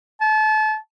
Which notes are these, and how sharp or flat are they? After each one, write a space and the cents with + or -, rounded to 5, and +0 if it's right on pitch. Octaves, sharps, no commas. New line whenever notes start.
A5 -30